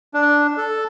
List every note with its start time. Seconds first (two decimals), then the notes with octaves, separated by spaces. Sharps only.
0.14 D4
0.57 A4